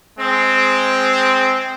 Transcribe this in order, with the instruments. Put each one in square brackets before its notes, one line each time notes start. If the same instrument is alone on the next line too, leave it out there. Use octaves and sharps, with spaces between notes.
[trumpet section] G#3 C4